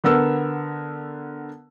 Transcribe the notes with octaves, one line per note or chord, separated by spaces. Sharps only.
D3 B3 A#4 E6